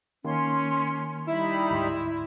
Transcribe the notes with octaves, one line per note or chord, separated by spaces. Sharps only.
D#3 A#3 C#4 C6
G3 D#4 E4 E5 B5
D2 G#2 C6